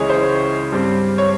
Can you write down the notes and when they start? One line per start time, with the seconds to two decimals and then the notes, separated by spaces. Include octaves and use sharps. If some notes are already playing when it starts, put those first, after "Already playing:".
Already playing: C#2 C#3 E3 G#3 G#4 C#5
0.10 C5
0.72 G2 G3 C4
1.18 C#5